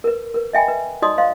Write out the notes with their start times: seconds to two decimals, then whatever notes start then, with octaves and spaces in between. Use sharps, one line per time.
0.04 A#4 B4
0.34 A#4 B4
0.53 D#5 E5 G5 G#5 B5
0.68 B4
1.02 D#4 F#4 D5 D#5 C6 D#6
1.18 C5 D#5 F5 C6